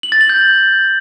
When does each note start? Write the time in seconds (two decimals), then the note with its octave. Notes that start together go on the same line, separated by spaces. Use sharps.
0.03 F#7
0.12 A6
0.21 F#7
0.29 G6